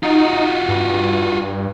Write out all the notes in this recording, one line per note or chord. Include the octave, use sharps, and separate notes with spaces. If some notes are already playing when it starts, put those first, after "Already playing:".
D#4 F4 F#4
G2